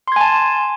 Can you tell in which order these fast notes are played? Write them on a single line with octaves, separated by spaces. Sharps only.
C6 G#6 G#5 A5